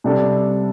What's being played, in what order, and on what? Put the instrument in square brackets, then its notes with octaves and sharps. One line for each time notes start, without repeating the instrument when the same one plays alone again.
[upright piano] C3 G3 D4 A4